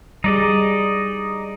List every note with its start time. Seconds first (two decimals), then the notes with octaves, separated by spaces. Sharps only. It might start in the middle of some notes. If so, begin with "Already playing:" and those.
0.24 G3 D#4 G#4 D5 D#5